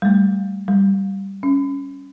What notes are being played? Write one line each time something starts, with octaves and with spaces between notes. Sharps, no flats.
G3 A3
G3
C#4